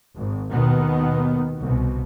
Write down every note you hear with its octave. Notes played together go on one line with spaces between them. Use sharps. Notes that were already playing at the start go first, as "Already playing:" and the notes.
G#1
D#2 B2 D#3 B3
C2 B2